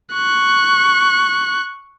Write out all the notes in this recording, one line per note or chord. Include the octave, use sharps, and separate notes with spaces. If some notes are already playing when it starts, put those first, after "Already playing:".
C#6 F#6